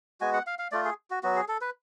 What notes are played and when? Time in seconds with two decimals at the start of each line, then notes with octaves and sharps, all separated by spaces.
0.21 G#3 B3 F#4 G#5
0.34 F#5
0.47 F5
0.59 F5
0.72 A3 F4 D5
0.85 G#4
1.10 F#4
1.23 F#3 B3 F#4
1.36 G#4
1.48 A4
1.61 B4